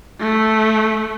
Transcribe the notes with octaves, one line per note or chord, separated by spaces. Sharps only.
A3